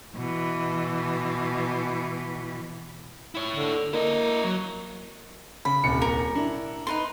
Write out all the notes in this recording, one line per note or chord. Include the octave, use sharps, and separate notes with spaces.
B2 E3
E4 C#5
D3
A#3 E4 D#5
F#3
C#3 B5
D#1 C2 C#7
A#4
D4 E4
D#4 B4 C6